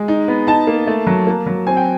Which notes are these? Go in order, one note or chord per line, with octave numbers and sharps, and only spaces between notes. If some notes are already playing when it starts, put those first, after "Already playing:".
Already playing: G#3
D#4
B3
D#4 A5
A#3
A3
F#3
A#3
F#3
C4 G#5
G5